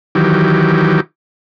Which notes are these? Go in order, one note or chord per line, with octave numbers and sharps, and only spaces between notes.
D#3 E3 F#3 G4